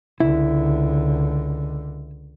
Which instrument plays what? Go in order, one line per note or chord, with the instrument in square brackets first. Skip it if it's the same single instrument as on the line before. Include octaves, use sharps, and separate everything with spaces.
[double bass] C#2 D3 [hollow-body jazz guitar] E4